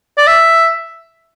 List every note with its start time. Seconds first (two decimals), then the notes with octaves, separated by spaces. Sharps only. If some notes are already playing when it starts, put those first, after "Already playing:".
0.18 D5
0.27 E5